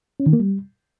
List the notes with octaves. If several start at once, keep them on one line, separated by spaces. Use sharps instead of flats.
C#4
D#3
A#3
G3